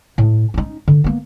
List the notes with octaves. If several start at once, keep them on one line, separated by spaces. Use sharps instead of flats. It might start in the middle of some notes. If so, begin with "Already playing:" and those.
A2
C#4 D#4
D3
A#3 B3